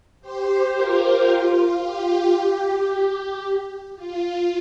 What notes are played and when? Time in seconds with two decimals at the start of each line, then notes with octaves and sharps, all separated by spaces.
0.21 G4 C5
0.75 F4 A#4
1.29 F4
1.82 G4
3.96 F4